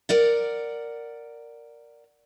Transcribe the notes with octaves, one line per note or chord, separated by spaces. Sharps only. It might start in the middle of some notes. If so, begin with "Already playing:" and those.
A#4 D5 F#5